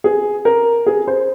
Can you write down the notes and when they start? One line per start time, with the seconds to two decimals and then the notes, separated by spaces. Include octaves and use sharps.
0.04 G#4
0.45 A#4
0.86 G#4
1.07 C5